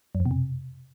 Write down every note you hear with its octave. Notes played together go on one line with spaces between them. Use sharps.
F#2
F2
B2
C3